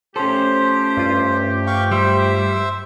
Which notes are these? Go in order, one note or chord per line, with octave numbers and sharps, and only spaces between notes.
F3 A3 C#4 G4 A4 C5
G2 F4
F5 G5 C#6
G3 C5 E5